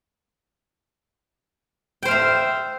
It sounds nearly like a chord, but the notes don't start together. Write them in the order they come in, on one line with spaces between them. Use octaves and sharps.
G5 C5 F5 E5